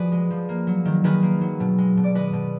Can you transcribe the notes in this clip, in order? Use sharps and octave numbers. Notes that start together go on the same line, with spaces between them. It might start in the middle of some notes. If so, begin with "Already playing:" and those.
Already playing: F3 F#4 G#4 B4 D5
G#3
F3
A#3
F#3
D#3
D#3 G#4 B4
A#3
F#3
B2
G#3
B2
D5
G#3 B4 D#5
B2